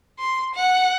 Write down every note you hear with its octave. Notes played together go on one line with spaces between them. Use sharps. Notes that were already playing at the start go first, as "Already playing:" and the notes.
C6
F#5